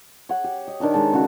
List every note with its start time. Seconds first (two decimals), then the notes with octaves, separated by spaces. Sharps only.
0.29 C#5 F#5
0.44 G4
0.67 D#5
0.80 D#3 D4 A#4 C#5
0.94 D#3 G#3 A4
1.13 C#3 F#4